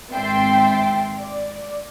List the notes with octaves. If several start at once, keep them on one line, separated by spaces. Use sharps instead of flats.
G#1 C4 E5 G5 C6 A6
D5